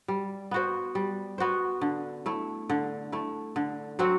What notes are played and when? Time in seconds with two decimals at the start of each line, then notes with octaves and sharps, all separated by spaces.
0.08 G3
0.51 B3 F#4 C5
0.95 G3
1.38 B3 F#4 C5
1.81 D3
2.26 A3 E4
2.69 D3
3.12 A3 E4
3.56 D3
3.99 F#3 C4 F#4